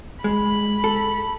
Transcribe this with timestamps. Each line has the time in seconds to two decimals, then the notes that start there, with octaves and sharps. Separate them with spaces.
0.24 G#3 B5
0.84 A4